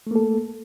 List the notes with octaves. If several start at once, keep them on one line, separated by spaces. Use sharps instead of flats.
A3 A#3 A4